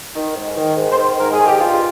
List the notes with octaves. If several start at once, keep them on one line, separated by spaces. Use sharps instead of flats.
D#3
G#2
D#3
G#2
C5
D#3
G#2 A#4
G#4
D#3
G4
G2 F4